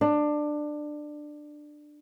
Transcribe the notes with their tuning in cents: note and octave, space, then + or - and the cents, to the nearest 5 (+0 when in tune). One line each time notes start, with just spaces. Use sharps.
D4 +15